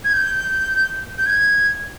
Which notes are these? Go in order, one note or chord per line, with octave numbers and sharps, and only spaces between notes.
G#6
G6
G6
G#6